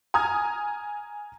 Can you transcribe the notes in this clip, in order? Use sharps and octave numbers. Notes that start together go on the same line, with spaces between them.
G#5 A#5 D#6 F6 G#6